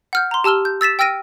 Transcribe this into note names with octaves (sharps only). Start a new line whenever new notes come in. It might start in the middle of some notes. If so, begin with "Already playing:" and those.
F#5 F6 G6
A#5 C6
G4 A5 E6 F6 G7
G6
E6 A6 B6 E7
G5 E6 F6 A#6 D7 D#7